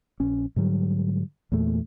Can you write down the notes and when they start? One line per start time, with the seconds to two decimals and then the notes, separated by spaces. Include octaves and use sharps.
0.20 A#1 C#4
0.56 G#2 D3 F#3 G3
1.52 E2 A#2 A3